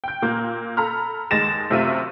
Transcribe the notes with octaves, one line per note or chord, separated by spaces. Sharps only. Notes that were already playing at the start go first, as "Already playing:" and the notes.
G5 G6
A#2 A#3 G6
A4 A#5 B5 F6
D#2 G#3 A6 A#6 E7
F#2 C3 A3 F4 E5 D#7